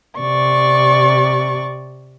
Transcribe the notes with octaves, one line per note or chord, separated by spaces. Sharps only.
C3 D5 C#6